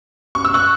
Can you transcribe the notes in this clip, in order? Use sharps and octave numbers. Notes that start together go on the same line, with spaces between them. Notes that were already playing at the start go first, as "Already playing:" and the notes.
C#6
E6
C#6 F#6